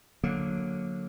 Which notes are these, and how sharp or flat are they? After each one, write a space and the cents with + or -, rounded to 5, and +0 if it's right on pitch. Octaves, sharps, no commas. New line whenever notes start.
D3 +0 F#3 -20 A#3 +0